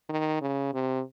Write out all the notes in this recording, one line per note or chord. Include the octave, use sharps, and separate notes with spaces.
D#3
C#3
C3